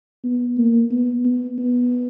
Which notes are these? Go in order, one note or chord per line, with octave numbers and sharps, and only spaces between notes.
B3
A#3
B3
B3
B3